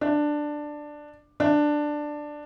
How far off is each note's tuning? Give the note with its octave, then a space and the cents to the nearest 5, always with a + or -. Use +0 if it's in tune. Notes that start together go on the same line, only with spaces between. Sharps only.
D4 +10
D4 +10